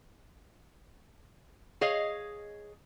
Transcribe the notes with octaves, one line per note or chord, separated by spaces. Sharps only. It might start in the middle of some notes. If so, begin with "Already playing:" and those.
G#4 C#5 D#5 F5